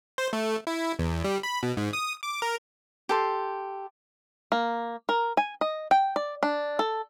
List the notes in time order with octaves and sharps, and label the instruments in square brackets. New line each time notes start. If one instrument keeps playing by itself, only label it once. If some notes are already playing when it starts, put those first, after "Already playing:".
[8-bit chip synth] C5
A3
E4
E2
G3
B5
B2
G#2
D#6
D6
A#4
[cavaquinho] G4 A4 C6
[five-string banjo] A#3
A#4
G#5
D#5
G5
D5
D4
A4